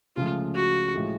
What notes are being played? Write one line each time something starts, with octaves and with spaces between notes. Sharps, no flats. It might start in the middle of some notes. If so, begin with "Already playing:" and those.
C#2 C#3 F3 A3 F4
F#4
A2 F3 G#3